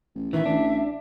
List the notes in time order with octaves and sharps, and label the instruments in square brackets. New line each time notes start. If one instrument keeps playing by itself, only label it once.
[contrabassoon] A1
[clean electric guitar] D#3 E3 [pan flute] E5
[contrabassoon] A1 [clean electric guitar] D4